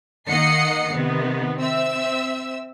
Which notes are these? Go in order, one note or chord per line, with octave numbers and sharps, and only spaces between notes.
D#3 A#3 D#5 F#5 C7 C#7
C3 D#3 B3
C4 E5 E6